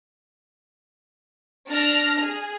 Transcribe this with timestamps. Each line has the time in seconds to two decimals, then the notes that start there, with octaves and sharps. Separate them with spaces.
1.69 D4 F6 A#6
2.21 G#4